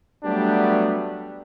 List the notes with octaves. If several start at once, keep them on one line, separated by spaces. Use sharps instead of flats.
F#3 G3 A3 B3 D4 G4